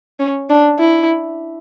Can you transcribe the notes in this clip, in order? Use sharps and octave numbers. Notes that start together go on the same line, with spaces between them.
C#4
D4
E4